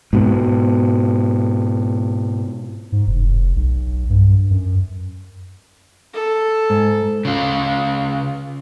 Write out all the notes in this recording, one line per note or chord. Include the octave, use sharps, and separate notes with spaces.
G#2 B2
G#2
F1
B1
G2
F#2
A4
G#2
C#3 F4